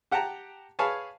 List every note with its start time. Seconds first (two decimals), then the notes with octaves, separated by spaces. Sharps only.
0.11 G4 F#5 G5 A5 A#5
0.79 G#4 B4 C#5 F5 G#5 A5